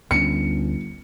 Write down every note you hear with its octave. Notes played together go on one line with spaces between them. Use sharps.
G1 D2 C#4 C#7